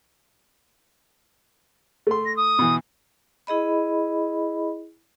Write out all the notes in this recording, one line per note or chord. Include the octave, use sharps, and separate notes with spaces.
A3 C6
A#6
D#6
B2 E3
E4 G#4 D#5 B5